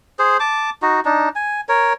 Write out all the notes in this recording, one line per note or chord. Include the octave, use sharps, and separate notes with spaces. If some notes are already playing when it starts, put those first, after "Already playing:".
G#4 C5
A5 D6
D#4 F#4
D4 D#4
G#5
A#4 C#5